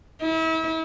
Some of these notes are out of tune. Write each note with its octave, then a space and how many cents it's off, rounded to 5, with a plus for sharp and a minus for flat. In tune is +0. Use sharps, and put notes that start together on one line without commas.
E4 -35